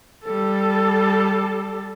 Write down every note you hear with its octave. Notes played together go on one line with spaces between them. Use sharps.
G3 A4